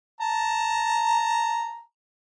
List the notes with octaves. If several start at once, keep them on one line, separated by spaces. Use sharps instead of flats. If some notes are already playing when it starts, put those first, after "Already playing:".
A5 A#5